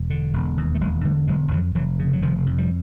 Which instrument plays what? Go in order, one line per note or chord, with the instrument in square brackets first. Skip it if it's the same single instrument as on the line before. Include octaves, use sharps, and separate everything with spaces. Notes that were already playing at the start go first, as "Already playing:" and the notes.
Already playing: [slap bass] E1
D3
E1
D#2
A3
E1 F#3 G#3
D3 G3 A3
E1 F#3 G#3
F2 E3 F#3
F1 E3 F#3
C#3
F#3
F1 D#3 F3
F2
F3 G3